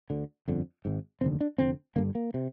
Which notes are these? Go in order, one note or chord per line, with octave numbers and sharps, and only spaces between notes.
D2 D3
G1 F2 D3
G#1 G#2
F1 D#2 D3 C4
D4
F1 F2 D3 C4
G1 G2 D3 A#3
A#3
C3